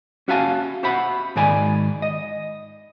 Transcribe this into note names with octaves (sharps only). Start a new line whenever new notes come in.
C#4 F#4 E5 F5 G#5 A5
F#4 C5 E5 F#5 B5
G#2 D#3 G#3 D5 G#5 B5
D#5